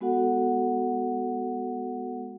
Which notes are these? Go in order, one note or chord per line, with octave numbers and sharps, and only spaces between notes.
G#3 B3 F#4 A4 F#5